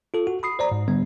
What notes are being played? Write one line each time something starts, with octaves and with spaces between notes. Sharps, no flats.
F4 A4
F#4
B5 D#6 C7
C5 D5 A#5
G#2
D3 G3 B3